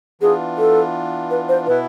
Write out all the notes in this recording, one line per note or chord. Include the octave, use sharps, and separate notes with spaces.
E3 B3 D4 F4 G#4
A4
B4
C5
B2 B3 E4 B4